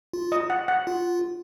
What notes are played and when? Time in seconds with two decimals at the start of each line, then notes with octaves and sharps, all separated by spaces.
0.13 F4
0.32 D#5
0.50 F#5
0.68 F#5
0.87 F4